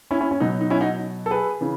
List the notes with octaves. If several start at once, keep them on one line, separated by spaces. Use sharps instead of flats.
C#4 E4
C#4 E4
C#4
B2 F#3 D#4
D#4
C#4 E4
D#4 F#4
A4
G#4 B4
C#3 E3